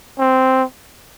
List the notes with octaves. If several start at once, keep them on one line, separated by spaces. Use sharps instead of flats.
C4